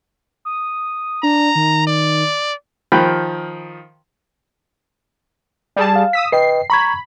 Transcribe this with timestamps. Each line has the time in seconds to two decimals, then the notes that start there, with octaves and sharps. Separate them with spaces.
0.45 D#6
1.23 D4 A#5
1.55 D#3
1.87 D5
2.92 D#3 F3 G5 B5 F#6
5.76 G3 G#4 A5
5.96 F5
6.13 D#6 E6 B6
6.32 B4 D#5 G5 C7
6.70 A#5 B5 C#6 G#6